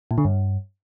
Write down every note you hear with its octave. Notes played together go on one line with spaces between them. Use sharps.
A#2
D3
G2